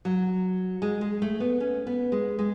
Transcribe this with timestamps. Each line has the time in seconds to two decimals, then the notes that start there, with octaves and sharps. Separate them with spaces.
0.05 F#3
0.82 G#3
1.01 G#3
1.22 A3
1.40 B3
1.60 C#4
1.87 B3
2.12 G#3
2.39 G#3